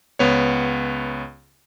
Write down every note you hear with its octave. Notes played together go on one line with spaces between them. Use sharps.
C#2 B3 C#5